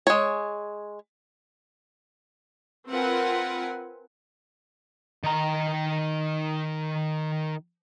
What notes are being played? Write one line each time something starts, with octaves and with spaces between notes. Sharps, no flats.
G#3 C#5
C4 F4 A#4 B4 F#5 G#5
D#3 A#5